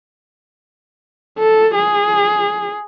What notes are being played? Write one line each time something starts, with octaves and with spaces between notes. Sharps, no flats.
A4
G#4